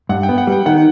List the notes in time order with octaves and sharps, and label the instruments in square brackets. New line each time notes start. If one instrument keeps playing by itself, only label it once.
[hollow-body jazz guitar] G2 [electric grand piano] F#5
[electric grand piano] G5
[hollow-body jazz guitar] B3
[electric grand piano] F#5
[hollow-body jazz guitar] G3 [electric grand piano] G5
[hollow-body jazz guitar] D#3 [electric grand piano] F#5